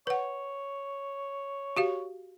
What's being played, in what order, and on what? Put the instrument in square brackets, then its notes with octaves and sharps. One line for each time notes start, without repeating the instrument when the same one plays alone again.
[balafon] B4 F#5 [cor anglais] C#5
[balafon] F#4 G4 F5